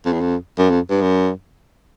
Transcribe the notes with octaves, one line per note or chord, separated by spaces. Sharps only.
F2
E2
F2
F#2
F2
G2
F#2